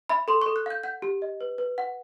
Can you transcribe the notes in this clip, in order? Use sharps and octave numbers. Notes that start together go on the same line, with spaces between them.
E5 B5
A4 C6
C#6
A4
F#6
F5 G6
F#5 G6
G4
D#5
B4
B4
F#5